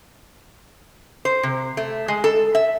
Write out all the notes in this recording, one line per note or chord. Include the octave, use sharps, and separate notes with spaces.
C5
C3
A3
G#3
A4
E5